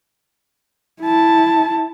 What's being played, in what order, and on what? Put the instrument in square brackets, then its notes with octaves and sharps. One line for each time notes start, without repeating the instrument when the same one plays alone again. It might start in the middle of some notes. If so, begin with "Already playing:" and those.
[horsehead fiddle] E4 A5